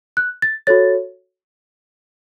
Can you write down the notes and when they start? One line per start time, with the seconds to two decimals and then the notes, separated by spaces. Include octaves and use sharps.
0.17 F#6
0.42 A6
0.67 F#4 A4 C#5 A6